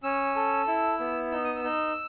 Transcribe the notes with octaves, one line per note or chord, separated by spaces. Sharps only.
C#4 E6
A4
E4
B3
D#4 E6
D#6
E6
D#4